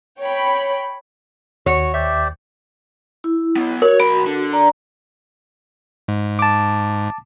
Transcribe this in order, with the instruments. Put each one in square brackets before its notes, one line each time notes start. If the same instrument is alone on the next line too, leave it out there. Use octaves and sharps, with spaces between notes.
[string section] C#5 G5 B5
[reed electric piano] D#2 [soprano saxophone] F#4 [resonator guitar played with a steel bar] C#5
[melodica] G4 C5 D5 [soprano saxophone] E5
[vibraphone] E4
[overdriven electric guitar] F#3 B3
[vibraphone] F#4 [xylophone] A#4 [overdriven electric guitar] C#5
[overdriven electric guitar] B1 B5 [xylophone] D7
[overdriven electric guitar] D3
[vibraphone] D5 A#5
[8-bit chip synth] G#2
[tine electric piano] A5 D6